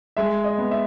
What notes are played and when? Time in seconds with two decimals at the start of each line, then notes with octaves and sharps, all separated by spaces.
0.17 G#3 E5
0.44 D#5
0.58 B3
0.71 E5